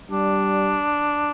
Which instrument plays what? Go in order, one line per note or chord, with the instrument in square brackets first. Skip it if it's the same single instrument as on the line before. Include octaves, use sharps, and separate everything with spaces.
[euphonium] G3 [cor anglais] D4